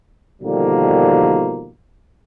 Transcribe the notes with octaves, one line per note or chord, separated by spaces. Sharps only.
B2 D3 D#3 F3 G3 A#3